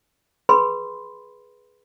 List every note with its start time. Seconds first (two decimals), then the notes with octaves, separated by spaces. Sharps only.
0.49 G#4 B4 B5 C6